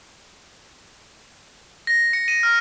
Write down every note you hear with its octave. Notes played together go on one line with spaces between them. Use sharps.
A#6
C#7
D#7
F6